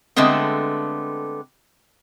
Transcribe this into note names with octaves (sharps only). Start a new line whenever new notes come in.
D3 G#3 A3 B3 C4